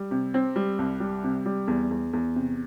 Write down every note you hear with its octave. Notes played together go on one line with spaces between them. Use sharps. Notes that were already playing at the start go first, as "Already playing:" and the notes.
Already playing: G3
C3
C4
G3
C2
G3
C3
G3
E2
E2
E2
C3